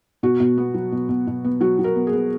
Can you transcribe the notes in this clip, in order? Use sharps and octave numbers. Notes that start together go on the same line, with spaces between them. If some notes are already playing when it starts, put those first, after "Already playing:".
B2 F#4
B2
B3
F#3
B2
B2
B2
B3
F#3 F#4
F#3
A#4
B3
G#4
B3